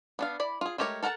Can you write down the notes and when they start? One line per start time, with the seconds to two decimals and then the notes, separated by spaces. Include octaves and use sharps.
0.19 B3 D4 F5
0.40 E4 D5 B5
0.61 F4 G#4
0.78 G#3 A3 G4 A#4 C#5
1.03 A4 A#4 F#5 G#5 A5